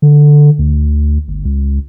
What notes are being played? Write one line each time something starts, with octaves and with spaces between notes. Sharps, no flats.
D3
D2
G1
C#2